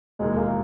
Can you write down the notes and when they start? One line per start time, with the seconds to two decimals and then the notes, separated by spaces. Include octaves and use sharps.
0.19 E1 D#2 D#3 G#3
0.37 A#3